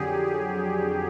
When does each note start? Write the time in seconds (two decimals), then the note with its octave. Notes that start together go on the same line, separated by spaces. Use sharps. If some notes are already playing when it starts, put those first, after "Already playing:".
Already playing: F2 D3 F#3 G4 G#4
0.26 G#4